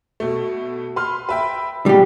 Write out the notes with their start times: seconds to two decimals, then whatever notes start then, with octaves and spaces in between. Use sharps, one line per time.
0.20 B2 A3
0.96 B4 C6 F6
1.29 B4 E5 G5
1.86 A#1 G3 G4